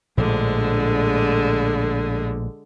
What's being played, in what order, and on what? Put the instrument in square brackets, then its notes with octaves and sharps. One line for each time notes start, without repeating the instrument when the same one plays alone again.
[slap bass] A#1 A2 F3 [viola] D3 G#3